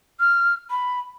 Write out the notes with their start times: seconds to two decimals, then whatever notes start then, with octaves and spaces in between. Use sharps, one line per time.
0.20 F6
0.70 B5